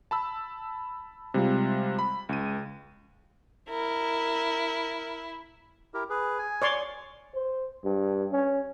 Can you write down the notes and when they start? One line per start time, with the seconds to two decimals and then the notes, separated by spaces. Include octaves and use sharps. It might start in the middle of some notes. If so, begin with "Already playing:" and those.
0.11 A5 B5 E6
1.34 C3 G3 G#3 F4
1.99 B5
2.29 C#2 D#7
3.70 E4 A#4
5.94 E4 G4 A#4
6.10 G#4 B4
6.38 G#5
6.62 C#5 D5 C6
7.34 C5
7.84 G2
8.32 C#4